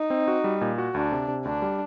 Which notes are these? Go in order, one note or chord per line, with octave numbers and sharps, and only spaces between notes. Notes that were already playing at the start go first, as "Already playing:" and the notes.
Already playing: D#4
C4
F#4
G3
A#2
F#4
D2 D4
C3
C3
D2 D4
G3